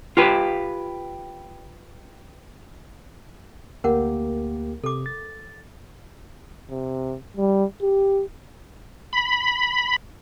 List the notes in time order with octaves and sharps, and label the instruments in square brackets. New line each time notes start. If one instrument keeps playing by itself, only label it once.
[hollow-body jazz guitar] F4 G4 B4
[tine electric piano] D2 A#3 G4 [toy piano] A#4 F#5
[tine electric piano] C3 [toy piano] A4 D6
[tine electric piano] A6
[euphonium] C3
G3
G4
[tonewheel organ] B5